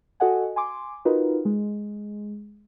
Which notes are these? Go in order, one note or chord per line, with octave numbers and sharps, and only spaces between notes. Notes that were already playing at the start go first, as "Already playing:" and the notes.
F#4 A4 D#5 F#5 G#5
G#5 C6 D6
D#4 F4 F#4 A#4 B4
G#3